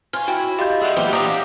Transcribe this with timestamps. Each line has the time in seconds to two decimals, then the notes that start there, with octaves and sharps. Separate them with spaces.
0.13 F4 C#5 G#5 F6
0.28 E4 F#4 G5
0.59 F4 G4 D#5 G6
0.82 G#4 A4 D5 E5 F#5
0.97 E3 F#3 G3 A#3 F4 G4
1.13 D4 G4 D5 E5 F5 A#5 D#6